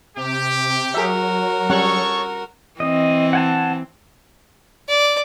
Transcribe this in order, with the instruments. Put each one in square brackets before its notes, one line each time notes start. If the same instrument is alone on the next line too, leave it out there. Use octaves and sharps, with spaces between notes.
[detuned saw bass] C3 [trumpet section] G4
[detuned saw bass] F#3 [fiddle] F#4 A#4 [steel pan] G#4 E5
[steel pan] G3 C#4 F#5 [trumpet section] A4 C#5 C#6
[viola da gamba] E3 C4 [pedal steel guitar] D#5
[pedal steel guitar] F#5 G#5 A5
[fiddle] D5